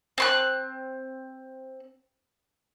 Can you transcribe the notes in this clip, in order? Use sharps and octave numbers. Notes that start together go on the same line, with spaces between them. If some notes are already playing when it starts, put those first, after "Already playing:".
C4 C6 F#6